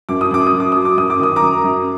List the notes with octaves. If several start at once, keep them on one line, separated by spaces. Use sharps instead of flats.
F#2 D6
D#6
F#2 D6
D#6
F#2
D6
F#3 D#6
D6
F#2 D#6
D6
D#3 D#6
A#5 D6
F#2
F#2